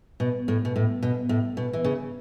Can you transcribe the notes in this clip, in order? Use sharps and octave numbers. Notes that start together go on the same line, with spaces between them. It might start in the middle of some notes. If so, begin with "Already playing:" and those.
B2
A2
B2
A2
B2
A2
B2
E3
C#3